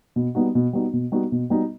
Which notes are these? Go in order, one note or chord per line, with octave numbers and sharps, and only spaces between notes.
B2
G3 B3 D#4 F#4
B2
G3 B3 D#4 F#4
B2
G3 B3 D#4 F#4
B2
G3 B3 D#4 F#4